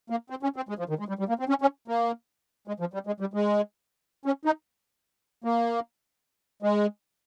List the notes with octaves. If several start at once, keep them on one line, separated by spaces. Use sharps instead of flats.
A#3
C4
C#4
C4
G#3
F3
D#3
G#3
G3
G3
A#3
C4
C#4
C#4
A#3
G#3
F3
G3
G#3
G3
G#3
C#4
D#4
A#3
G#3